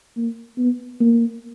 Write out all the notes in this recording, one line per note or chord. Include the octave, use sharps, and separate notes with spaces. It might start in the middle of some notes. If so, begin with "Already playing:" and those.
A#3
B3
A#3